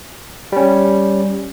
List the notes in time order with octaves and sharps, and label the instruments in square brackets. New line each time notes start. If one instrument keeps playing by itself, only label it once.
[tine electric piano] G3 C#4